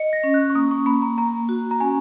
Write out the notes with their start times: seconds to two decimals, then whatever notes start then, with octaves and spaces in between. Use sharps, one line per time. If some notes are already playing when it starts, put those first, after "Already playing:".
Already playing: D#5 C#7
0.13 A#6
0.23 C#4
0.34 F#6
0.50 C#6
0.55 A#3 D#6
0.71 C#6
0.86 A#3 B5
1.02 A#5
1.18 A#3 A#5
1.49 F#4
1.71 A#5
1.80 C#4 G#5